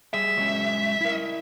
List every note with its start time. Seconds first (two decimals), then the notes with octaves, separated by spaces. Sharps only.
0.14 G3 G#4 E5
0.37 F#3 G#3 C#4
1.01 E4 A#4